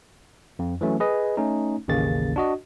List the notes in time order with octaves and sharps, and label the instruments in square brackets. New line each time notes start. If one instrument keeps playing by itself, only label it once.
[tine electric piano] F2
E3 F#3 A3 C#4
G#4 B4 D#5
A3 C#4 D#4
A1 D#2 C#3 A#3 A6
D4 F#4 D#5